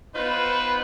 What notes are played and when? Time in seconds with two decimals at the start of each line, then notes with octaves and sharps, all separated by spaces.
0.15 B3 D#4 F4 B4 C5